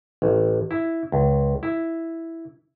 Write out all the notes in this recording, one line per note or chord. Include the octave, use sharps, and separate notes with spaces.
A1
E4
C#2
E4